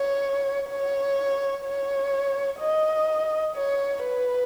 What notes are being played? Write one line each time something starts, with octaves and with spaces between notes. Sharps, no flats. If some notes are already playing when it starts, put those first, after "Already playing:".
Already playing: C#5
C#5
C#5
D#5
C#5
B4